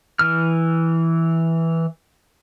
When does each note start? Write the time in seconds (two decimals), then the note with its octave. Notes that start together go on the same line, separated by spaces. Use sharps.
0.19 E3 F6